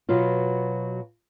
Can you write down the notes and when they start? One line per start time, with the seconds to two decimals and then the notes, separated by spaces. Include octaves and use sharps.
0.09 B2 F#3 B3 F4